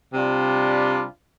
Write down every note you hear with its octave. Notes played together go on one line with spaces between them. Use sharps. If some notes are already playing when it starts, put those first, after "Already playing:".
C3 G3 D4 F4